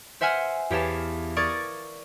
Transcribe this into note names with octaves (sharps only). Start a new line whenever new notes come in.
C5 E5 F#5 G#5 F6
E2 G4 C#5 F5 A5
A#4 D5 C#6 D#6 G#6 A6